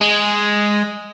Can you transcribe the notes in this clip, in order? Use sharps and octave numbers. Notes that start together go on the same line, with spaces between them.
G#3